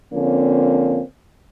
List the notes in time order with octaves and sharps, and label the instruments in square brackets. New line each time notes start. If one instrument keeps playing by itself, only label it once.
[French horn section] D3 F3 A#3 C4 C#4